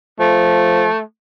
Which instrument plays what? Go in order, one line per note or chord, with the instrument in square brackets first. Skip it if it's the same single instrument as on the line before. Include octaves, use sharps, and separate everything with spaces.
[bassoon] F3 [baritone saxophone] A3